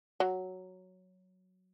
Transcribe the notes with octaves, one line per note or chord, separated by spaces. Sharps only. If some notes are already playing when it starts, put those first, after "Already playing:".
F#3